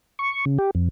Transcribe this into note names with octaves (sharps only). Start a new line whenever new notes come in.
C#6
C#3
G4
F2